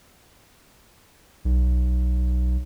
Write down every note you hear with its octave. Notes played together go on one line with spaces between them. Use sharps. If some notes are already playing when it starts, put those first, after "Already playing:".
B1